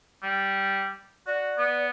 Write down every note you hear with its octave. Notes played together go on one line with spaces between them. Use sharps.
G3
F#4 D5
B3